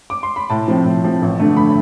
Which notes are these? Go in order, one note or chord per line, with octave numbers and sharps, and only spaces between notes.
D6
C6
B5
A2 A5
F3 C4
A2
F3 C4
A1
G2 D3 A3
B5